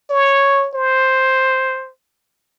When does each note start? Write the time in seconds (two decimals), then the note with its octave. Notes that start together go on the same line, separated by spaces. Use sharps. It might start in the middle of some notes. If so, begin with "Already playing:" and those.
0.10 C#5
0.75 C5